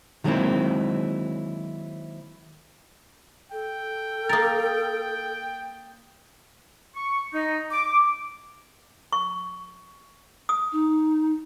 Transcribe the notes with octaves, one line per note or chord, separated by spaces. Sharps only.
D#3 F#3 G#3 A#3 C4 E4
A4 G5
A#3 A#4 D#6 A6
C#6
D#4
D6
C#6
D#6
D#4